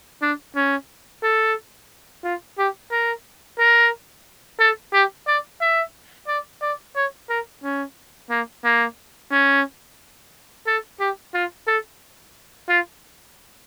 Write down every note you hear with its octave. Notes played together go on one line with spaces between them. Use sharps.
D4
C#4
A4
F4
G4
A#4
A#4
A4
G4
D5
E5
D5
D5
C#5
A#4
C#4
A#3
A#3
C#4
A4
G4
F4
A4
F4